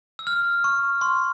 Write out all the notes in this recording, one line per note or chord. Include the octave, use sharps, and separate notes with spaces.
E6
F6
C#6
C6